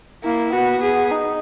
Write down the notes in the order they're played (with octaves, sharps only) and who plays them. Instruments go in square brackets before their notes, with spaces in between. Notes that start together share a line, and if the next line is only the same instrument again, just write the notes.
[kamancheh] A#3 [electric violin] E4
[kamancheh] B3 [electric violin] F#4
[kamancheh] B3 [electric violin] G#4
[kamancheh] D#4